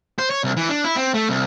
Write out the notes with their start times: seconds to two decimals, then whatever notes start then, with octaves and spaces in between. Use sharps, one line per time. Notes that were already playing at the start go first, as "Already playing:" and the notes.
0.19 C5
0.30 C#5
0.44 C2
0.56 E3
0.69 D4
0.84 E4
0.96 C4
1.14 A3
1.29 C2